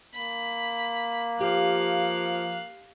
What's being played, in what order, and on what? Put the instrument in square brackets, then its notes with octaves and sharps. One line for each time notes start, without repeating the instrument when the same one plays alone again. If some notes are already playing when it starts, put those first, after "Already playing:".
[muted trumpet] A#3 [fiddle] B5
[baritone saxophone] F3 [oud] G4 [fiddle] F5 F#6